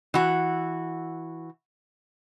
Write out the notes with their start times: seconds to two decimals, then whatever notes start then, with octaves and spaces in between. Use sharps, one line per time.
0.14 E3 F#4